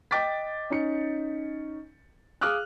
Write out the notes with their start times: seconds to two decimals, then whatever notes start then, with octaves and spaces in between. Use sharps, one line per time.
0.11 D#5 G5 D6 G6 A6 B6
0.70 C#4 D#4 C#7
2.41 G#4 F5 D6 D#6 F6 F#6